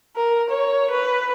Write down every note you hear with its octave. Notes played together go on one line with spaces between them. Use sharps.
A#4
C#5
B4